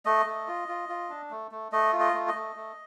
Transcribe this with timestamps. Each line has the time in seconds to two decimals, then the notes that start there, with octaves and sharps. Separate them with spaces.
0.05 A3 D#5
0.26 A3
0.47 F4
0.68 F4
0.89 F4
1.10 D4
1.30 A3
1.51 A3
1.72 A3 D#5
1.93 F4
2.00 D#5
2.14 A3
2.28 D#5
2.34 A3
2.56 A3